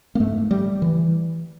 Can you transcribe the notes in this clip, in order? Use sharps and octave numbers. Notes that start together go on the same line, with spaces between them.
A#3
G#2 A3
G3
E3